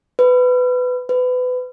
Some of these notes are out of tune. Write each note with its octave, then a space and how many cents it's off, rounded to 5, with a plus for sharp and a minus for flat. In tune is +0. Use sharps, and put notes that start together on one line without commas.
B4 +15
B4 +25